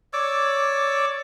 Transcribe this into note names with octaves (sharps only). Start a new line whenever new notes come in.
C#5 D5 D6 E6